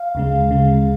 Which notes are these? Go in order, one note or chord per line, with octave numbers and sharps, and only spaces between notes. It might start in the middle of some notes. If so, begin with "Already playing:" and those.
Already playing: F5
D2 C#3 G#3
D2 C#3 G#3